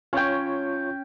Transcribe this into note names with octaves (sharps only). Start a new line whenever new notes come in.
C#4 F4 C#5 G5